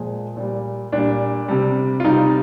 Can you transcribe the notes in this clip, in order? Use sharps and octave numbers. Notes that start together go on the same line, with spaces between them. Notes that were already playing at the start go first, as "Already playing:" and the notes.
Already playing: A#2 F3 G#3
A#2 G3
A#2 G3 D4
C3 G3
F4
C3 G3 D#4